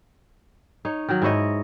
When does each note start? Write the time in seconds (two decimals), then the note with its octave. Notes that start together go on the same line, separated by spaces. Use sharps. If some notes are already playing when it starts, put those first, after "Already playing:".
0.85 D#4 C#5
1.09 D#3 F#3
1.22 G#2 E4 C#5 D#5